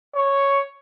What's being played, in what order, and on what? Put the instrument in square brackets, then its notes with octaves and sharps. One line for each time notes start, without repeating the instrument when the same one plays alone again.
[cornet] C#5